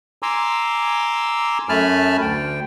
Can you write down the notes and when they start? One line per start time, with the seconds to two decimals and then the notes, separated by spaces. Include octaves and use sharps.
0.22 G#5 A#5 C6 D6 E6
1.69 F#2 A3 G#5 A5 B5 F6
2.21 D2 G5